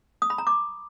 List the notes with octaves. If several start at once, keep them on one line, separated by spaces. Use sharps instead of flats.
D#6
B5
A#5
D6